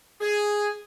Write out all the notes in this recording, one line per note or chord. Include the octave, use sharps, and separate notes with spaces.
G#4